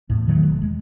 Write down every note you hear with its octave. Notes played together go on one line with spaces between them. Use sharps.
E2 A2
A#2 D#3 F#3 A3
E1
G#3